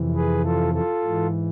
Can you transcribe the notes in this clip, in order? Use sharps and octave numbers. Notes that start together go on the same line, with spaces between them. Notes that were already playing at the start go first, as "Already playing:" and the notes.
Already playing: F2 C3 E3
G#4 B4
F4 A4
F4 A4
G#2 E3